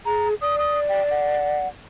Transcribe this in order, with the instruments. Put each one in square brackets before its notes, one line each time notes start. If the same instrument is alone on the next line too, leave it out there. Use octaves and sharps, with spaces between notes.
[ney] G#4 [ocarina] A#5
[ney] D5 [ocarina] D#6
[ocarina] D#6
G5
F#5